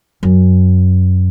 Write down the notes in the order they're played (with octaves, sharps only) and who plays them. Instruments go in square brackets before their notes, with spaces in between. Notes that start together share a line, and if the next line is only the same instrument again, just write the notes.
[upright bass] F#2